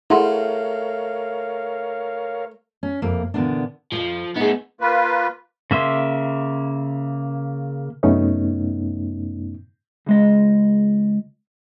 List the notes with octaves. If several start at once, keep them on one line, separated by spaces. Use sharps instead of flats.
A3 E4 G#4 A#4 C#5 F5 F#5 C6
C#4
F2 C3 A#3
A#2 D3 E3 F3 B3 D4
F2 G#2 F3
A3 B3 D#4 G#4
A#3 F4 B4
C#3 A#3 E5 C6
F#2 C3 A3 B3 C#4 D#4
C#2 G#3 D#5